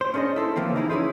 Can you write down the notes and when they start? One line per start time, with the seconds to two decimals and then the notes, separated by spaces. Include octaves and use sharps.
0.01 C5
0.14 C#4 D4 G#4 B4 D#5
0.36 E4 A4 C5
0.56 C#2 E3 F3 A#3 C4
0.76 D#4 E4 G4 G#4
0.90 C#4 E4 G#4 B4 C5